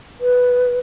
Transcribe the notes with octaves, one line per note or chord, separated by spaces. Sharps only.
B4